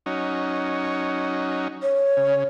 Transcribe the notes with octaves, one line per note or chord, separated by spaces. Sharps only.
F#3 C#4 D#4
C#5
C#3